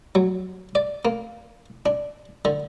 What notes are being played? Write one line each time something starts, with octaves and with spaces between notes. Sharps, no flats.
F#3
D5
A#3
D4
D3